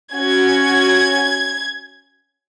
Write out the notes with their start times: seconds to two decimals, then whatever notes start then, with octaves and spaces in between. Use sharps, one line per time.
0.13 C#4 F#4 G#6